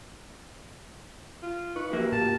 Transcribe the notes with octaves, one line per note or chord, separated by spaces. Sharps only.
F4
D#4 F4 B4 C#6
F#2 F3 A#3 G4 E5
A2 F4 G4 A5